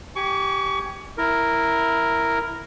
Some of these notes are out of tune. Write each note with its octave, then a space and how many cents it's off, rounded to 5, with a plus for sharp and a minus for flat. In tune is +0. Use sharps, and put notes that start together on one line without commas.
G4 -10 G#5 +0 C#6 +30
E4 +0 A#4 +0